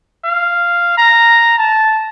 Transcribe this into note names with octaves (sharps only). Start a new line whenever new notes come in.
F5
A#5
A5